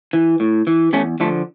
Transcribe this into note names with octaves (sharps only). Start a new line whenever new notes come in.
E3
A2
E3
E2 A3 C#4
D3 F3 A3